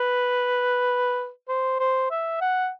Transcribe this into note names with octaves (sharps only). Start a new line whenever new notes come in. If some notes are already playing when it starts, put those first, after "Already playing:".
Already playing: B4
C5
C5
E5
F#5